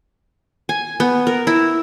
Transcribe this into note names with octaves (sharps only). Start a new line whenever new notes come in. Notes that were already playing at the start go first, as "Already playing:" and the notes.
G#5
B3
A#4
E4